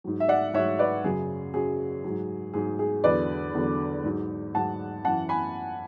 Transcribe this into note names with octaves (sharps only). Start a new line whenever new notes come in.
G#2 F#3
E5
D5 F#5
G#2 F#3 C#5 E5
B4 D5
F#2 C#3 F#3 G#4
F#2 C#3 F#3 G#4
G#2 F#3
G#2 F#3 G#4
G#4
E2 D3 F#3 B4 D5
E2 D3 F#3
G#2 F#3
G#2 F#3 F#5 A5
F#2 E3 F#5 A5
G#5 B5